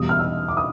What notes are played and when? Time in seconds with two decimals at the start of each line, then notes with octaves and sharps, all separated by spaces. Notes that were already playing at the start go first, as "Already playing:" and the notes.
Already playing: E2 B2 G3 D#6
0.09 F6
0.19 E6
0.48 D6
0.57 D#6